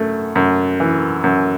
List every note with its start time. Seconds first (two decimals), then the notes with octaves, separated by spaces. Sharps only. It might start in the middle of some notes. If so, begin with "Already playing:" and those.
Already playing: F#2 A3
0.35 F#2
0.80 E3
1.24 F#2